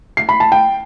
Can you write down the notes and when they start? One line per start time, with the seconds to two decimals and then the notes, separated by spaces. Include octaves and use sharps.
0.17 C7
0.29 B5
0.40 A5
0.52 G5